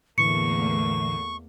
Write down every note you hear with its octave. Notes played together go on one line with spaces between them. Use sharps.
E2 A2 D3 E3 A3 A#3 C#6 C#7